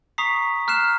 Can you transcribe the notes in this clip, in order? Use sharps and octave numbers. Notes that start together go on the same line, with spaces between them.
A#5 C#6 D#6 B6 C7
A#5 F6 F#6 C7 E7